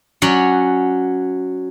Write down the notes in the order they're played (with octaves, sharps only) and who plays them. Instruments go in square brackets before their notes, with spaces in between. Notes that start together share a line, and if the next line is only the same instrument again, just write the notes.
[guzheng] F#3 C#4 D5 F#5